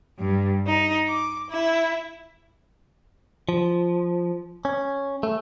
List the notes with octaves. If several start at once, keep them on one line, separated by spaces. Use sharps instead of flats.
G2
D#4
D6
E4
F3
C#4
A3